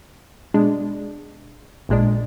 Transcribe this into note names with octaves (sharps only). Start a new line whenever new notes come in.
B2 G#3 D4
A#1 A#2 G#3 D4